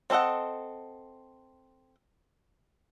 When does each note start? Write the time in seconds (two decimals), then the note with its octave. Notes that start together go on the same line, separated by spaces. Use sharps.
0.10 C4 D4 A4 D#5 F#5